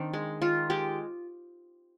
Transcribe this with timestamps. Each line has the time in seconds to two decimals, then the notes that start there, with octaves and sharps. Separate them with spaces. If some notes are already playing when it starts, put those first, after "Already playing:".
Already playing: D#3 C4 D4
0.13 G#3
0.42 D#3 F4
0.70 G#3 G4